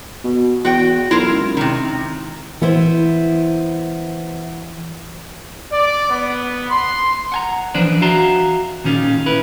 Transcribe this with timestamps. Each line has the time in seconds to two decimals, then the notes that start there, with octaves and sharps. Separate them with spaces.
0.24 B2
0.65 E2 F#4 G5
1.11 B1 E4 F4 A#4
1.30 C#2
1.57 C3 D#3
2.62 E3 B3 E4 C5
5.72 D5
6.09 B3
6.70 C6
7.32 F#5 G#5 A#5
7.74 E3 F3 D4 B4 C5 D5
8.02 F#4 E5 F5 A5 A#5 C6
8.84 A#2 D#3 C#4 F4
9.26 C#4 E4 B4